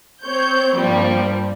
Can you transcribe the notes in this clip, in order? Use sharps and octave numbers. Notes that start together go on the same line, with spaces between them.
C4 C5 C#5 G6
G2 F3 G3 A#3 C4